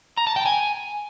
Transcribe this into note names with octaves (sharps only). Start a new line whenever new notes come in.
A#5
A5
G5
G#5